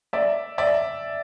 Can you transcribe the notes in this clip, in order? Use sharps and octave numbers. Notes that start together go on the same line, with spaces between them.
D5 E5
D5 E5